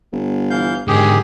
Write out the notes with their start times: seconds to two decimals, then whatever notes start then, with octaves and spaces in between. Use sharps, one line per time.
0.13 G1
0.50 E3 F5 G6
0.88 G#2 D3 D#3 G4 G#4